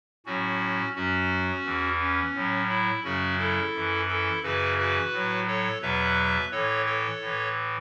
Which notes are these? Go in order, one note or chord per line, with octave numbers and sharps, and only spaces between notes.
A2 F#3 C#4 F#4
F#2 F#3 C#4 F#4
E2 E3
C#4
A2 F#3
E4
F#2 C#3 F#3 C#4 F#4
E4 A4
F#2 E3
E4 A4
F#2 C#3 E3 F#4 B4
F#4 B4
A2 F#3
A4 C#5
E2 B2 F#3 B4 E5
A2 E3 A4 C#5
A4 C#5
A2 E3